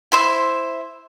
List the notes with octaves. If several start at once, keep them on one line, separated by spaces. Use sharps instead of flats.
E4 C5 E5